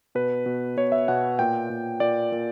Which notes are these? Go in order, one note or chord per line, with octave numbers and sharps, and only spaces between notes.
B2 B4
B2
B2 C#5
E5
B2 F#5
A#2 G5
A#2
A#2 D5
A#2